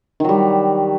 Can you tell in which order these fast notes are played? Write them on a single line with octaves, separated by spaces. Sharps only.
D#3 F#3 G3